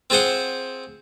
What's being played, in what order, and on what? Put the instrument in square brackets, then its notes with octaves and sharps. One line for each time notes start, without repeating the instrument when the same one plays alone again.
[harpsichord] C4 F4 G#4 C5 F#5